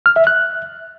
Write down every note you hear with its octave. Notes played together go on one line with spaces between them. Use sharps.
F6
E5
F#6